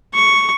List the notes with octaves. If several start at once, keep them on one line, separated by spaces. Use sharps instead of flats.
C#6